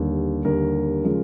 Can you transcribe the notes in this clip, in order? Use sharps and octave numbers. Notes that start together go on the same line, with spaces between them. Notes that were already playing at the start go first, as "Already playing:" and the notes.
Already playing: D#2 D3 G3
D#2 D3 G3 A#4
C#3 F3 G#3